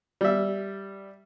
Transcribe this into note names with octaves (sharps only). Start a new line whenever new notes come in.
G3 E5